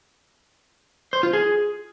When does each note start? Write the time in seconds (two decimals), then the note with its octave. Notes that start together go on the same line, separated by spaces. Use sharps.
1.13 C5
1.23 F4
1.33 G#4